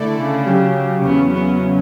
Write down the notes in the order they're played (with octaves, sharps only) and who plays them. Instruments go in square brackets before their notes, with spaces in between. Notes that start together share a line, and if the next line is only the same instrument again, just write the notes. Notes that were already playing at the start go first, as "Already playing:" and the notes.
Already playing: [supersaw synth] D3 A3 E4 A4 D5
[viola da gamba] C#3
[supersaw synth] F#3 C#4 G4
[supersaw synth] E2 C#3 F#3 C#4 [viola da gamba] B3
[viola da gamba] B3